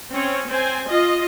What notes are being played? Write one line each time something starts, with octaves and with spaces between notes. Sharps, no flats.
C4 C#4 C#5
C4 C5 G#5
F4 D#5